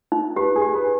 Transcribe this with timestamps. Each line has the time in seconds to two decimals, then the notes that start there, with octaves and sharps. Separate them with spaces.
0.12 D#4
0.36 G4 B4
0.56 G#4
0.62 G4
0.74 B4